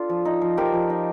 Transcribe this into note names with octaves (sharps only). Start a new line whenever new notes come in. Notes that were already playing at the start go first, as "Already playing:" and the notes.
Already playing: D4 F4 A4
F3
D#4
F3
F3 G4 A#4
F3
D#4